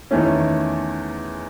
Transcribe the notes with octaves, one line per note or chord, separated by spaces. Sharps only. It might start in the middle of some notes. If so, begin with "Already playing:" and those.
E2 D#3 A3 C#4